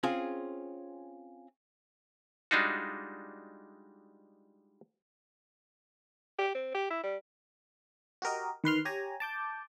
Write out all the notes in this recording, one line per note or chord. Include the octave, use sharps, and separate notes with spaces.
C4 C#4 F4 G#4
G3 G#3 D4 D#4 F4 F#4
G4
C4
G4
E4
G3
F#4 G4 A#4 D#5
D#3 B4 C6 F6
G4 C#5 G#5 A#5
A5 D6 G6